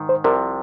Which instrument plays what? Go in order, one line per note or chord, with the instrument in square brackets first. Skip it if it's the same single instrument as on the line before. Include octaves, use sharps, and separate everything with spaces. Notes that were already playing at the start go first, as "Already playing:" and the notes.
Already playing: [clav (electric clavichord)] G#2 D#3
[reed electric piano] C5
[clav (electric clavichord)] C2 C3 F3 [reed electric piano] A#4